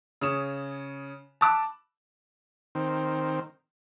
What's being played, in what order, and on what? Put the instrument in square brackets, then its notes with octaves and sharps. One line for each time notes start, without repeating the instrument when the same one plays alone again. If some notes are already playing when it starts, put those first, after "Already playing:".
[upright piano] C#3 C#5 D#6 E7
A5 B5 D6 E6 F#6
[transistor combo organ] D#3 C4